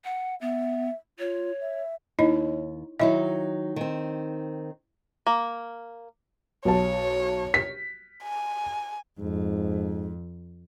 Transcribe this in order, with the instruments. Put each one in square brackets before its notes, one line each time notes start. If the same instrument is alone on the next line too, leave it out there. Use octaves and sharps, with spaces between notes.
[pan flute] F#5
[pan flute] B3 [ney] E5
[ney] F4 [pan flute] C#5
[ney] E5
[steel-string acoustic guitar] D#2 [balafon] D#4 E4 D#5
[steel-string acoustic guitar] D#3 F#3 D#4 [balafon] E4 D#5 E5
[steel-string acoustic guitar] D#3 C4
[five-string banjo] A#3
[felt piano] B1 A5 [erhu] C#5
[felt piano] B6
[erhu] G#5
[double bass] F2 [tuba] G#2